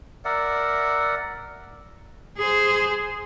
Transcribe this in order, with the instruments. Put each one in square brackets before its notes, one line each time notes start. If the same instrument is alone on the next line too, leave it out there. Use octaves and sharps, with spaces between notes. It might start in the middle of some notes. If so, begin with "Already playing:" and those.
[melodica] A#4 D5 E5 F#5
[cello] G#4 C5